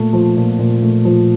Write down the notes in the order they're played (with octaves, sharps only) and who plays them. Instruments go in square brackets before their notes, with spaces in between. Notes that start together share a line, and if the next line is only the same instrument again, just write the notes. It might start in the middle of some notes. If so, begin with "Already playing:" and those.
Already playing: [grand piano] A#2 A3
F3
A#2
A#2
A3
F3